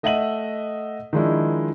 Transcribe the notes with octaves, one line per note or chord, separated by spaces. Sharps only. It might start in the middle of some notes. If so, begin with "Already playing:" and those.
A3 D#5 E5 F#5 D#7 F#7
D#3 F3 G#3 D4 E4